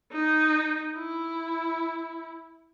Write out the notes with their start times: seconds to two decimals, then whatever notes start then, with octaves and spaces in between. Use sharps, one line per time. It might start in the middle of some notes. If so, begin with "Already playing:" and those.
0.12 D#4
0.97 E4